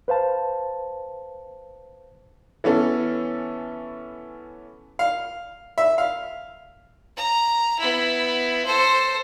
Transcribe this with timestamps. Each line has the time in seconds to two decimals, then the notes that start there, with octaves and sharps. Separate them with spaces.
0.08 B4 C5 F5 A5
2.64 E3 B3 C#4 A4
4.99 F5
5.78 E5
5.98 F5
7.17 A#5
7.79 B3 E4
8.65 A4 C5